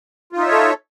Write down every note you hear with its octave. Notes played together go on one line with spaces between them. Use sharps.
D#4 F4 A4 C#5 E5